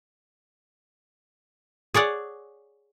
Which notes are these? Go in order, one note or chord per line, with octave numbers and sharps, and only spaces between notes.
G#4 C#5 D5 F#5